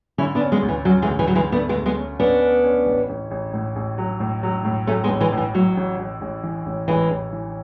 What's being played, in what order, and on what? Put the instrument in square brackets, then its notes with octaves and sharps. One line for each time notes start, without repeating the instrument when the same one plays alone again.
[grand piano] D3 [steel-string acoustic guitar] C#4 E4
[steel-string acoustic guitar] B3 D4
[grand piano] C#4
[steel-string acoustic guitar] G#3 B3
[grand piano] D2
[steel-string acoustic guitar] E3
[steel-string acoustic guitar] F#3 [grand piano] C#4
[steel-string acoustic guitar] E3 G#3
[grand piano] D2
[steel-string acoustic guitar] E3 G#3
F#3
[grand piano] D3
[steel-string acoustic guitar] E3 G#3
[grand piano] A3 [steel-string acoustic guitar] B3 D4
[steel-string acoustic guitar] G#3 B3
[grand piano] D2
[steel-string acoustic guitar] G#3 B3
[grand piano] C#4
[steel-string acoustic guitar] B3 D4 [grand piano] C#4
[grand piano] C#4
C#4
A1
A1
A1
A2
A1
F#3
A2
F#3
A2
[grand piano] F#3 [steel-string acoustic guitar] A3 C#4
[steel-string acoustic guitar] G#3 B3
[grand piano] A1
[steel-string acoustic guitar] E3 G#3
[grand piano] A2
[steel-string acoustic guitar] E3
[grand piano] A2 [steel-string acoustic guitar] F#3
[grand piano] A1
A1
A1
E3
A1
[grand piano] A1 [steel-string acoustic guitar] E3 G#3
[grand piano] A1
E3